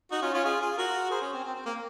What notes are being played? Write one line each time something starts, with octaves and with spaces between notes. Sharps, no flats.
D#4 F#4
C#4 F4
C#4 F4
F4 G#4
F4 G#4
F#4 A#4
G#4 C5
C#4
C4
C4
C4
A#3